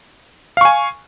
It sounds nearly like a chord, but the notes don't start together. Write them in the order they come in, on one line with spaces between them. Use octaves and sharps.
F5 C#6 G#5